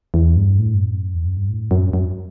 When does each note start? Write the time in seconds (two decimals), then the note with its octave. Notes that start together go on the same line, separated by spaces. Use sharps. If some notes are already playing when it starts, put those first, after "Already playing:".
0.14 E2
0.36 G2
0.59 A2
0.74 G2
0.81 F#2
1.14 E2
1.25 F#2
1.37 G2
1.49 A2
1.71 F#2
1.93 F#2